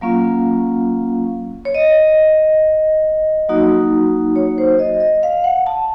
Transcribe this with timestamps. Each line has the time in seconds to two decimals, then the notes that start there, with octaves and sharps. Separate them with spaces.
0.01 F#3 A#3 C#4 F4 F5
1.65 C#5
1.75 D#5
3.49 F#3 A#3 D#4 F#4
4.36 C#5
4.58 C5
4.79 D#5
5.00 D#5
5.23 F5
5.44 F#5
5.67 A5